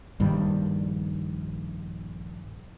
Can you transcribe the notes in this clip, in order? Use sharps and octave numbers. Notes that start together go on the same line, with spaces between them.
A#1 G2 D#3 G3